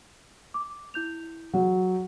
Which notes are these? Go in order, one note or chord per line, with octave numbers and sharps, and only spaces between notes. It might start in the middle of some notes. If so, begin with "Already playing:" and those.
D6
E4 G6 F7
F#3 F#4 G#4 F#5